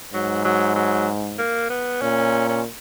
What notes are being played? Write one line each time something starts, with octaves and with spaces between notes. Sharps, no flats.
G#2 F#3
F#3
F#3
A#3
B3
A#2 C#4
C#4